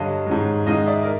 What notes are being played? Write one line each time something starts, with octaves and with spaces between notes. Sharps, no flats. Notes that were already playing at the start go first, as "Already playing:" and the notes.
Already playing: G2 D3 F#3 D#5 F5
G#2 D#3 F#3
G#2 D#3 G#3 D#5 F5
D5 E5
A#4